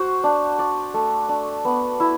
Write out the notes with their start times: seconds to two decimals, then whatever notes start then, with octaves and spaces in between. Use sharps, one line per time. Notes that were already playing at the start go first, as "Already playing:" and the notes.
Already playing: F#4 C5
0.24 D4
0.59 D5
0.94 A3
1.29 D4
1.65 B3
2.00 E4